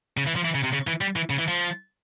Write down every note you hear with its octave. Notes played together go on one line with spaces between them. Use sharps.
C#3
E3
F3
E3
C#3
C3
C#3
E3
G3
E3
C#3
E3
F3